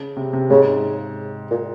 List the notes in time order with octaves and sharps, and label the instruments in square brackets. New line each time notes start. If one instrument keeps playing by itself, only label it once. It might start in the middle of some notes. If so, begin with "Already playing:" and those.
Already playing: [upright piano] C#3
C3
C3
[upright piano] G#2 [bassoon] C#3
[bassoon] A#2